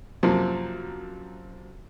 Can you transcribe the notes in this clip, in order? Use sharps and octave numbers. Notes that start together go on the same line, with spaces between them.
F#2 C3 F3 A#3